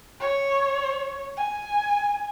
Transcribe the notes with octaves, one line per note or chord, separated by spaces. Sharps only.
C#5
G#5